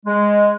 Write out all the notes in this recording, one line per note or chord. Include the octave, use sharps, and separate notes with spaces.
G#3